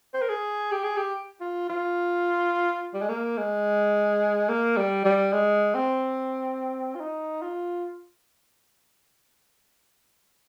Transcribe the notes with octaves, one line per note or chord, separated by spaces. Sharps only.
C5
A#4
G#4
G4
G#4
G4
F4
F4
G3
G#3
A#3
G#3
A#3
G3
G3
G#3
C4
F4
D#4
F4